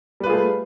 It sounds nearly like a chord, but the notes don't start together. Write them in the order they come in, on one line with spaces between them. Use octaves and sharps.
G3 B4 F4 G#4 A3